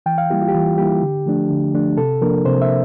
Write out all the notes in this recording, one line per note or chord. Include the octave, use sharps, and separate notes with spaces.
E3 G5
F5
G3 A#3 E4 G4
F4
G4
E3 F4
G3 A#3 E4 G4
D3
F3 A3 D4
D3
F3 A3 D4
C3 A4
F3 A#3 D4 A#4
C3 C5
E5